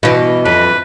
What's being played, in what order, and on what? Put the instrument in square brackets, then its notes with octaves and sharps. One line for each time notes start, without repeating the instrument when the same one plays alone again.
[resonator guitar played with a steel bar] G2 E3 [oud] B2 [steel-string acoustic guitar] D#5
[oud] F2 [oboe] B4